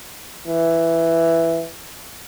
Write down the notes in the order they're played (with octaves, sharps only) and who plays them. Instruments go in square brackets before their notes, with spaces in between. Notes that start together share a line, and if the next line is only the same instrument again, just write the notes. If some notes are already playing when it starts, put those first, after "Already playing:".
[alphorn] E3